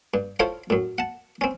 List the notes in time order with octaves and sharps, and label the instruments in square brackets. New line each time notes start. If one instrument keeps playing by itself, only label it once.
[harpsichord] G2
E4 F4 A4 C5 C#5 F5
F#2 A2
F#5 A5
C4 C#4